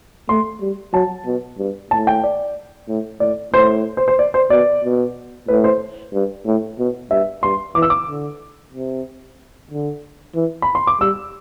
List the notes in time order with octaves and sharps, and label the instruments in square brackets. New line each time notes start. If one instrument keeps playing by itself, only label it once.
[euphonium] A3 [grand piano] C6
[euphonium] G3
[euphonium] F#3 [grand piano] A5
[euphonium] B2
G2
[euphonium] A2 [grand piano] A5
[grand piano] G5
D5
[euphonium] A2
[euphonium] A2 [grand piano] D5
[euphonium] A2 [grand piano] C5
[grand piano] C5
C5
D5
C5
[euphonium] B2 [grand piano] D5
[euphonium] B2
[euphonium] A2 [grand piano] B4
[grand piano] C5
[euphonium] G2
A2
B2
[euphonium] G2 [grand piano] E5
[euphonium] G2 [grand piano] C6
[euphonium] E3 [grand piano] D6
[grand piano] E6
D6
[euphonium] D3
C3
D3
E3
[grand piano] B5
C6
D6
[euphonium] G3 [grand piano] E6